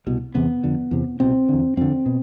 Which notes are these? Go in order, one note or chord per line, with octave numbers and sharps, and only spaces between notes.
C2 B2
E2 C3 B3
F2 D3
E2 C3
C2 B2 C4
E2 D3
F2 D3 C4
B2